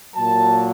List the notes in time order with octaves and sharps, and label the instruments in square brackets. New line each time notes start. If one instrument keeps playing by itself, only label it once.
[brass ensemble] A#2 F#3 A#3 A5